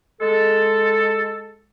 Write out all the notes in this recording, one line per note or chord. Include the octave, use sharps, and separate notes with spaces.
G#3 A4